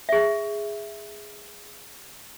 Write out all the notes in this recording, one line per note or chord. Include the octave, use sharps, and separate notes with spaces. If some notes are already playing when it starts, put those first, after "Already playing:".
G#4 E5